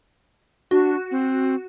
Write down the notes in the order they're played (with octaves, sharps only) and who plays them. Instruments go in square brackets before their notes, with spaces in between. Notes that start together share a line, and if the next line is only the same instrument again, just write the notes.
[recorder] D4 [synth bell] F#4
[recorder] C4